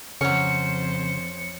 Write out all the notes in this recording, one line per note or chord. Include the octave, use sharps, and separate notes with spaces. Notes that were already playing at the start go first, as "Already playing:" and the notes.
F2 C#3 F#3 C#4 C5 C#7